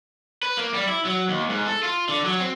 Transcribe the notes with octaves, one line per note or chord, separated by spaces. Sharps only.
B4
A#3
G3
E4
F#3
D#2
G#2
A4
F4
D3
F#3
C4